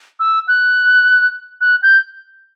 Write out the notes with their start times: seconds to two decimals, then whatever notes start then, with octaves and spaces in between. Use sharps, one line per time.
0.20 E6
0.48 F#6
1.61 F#6
1.83 G6